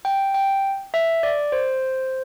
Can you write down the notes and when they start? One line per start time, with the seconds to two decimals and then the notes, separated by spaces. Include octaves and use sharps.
0.05 G5
0.34 G5
0.94 E5
1.23 D5
1.52 C5